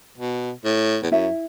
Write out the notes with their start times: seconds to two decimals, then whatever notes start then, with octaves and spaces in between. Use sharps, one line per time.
0.18 B2
0.65 A2
1.03 E2
1.12 F#2 E4 E5